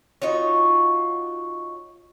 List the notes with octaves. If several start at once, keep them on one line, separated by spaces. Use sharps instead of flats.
D#4 F4 F#4 C#5